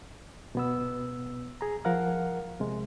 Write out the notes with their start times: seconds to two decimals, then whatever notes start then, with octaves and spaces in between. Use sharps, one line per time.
0.55 B2 B3 E6
1.61 G#4 A#5
1.85 F3 A#4 F5 F#5 F6
2.60 C3 G#3